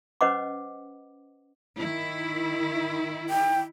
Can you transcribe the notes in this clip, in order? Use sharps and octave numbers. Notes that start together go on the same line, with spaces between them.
C#4 B4 C5 D#5 F#5 D6
D#3 E4
G5